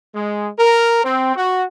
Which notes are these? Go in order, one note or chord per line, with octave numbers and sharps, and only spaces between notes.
G#3
A#4
C4
F#4